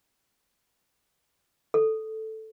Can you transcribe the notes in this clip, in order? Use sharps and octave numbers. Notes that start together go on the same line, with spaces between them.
A4